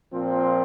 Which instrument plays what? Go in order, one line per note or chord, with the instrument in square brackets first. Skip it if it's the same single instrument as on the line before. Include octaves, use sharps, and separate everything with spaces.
[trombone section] A#2 F3 C4